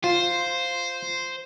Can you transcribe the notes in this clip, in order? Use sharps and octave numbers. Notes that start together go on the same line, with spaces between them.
F4 C5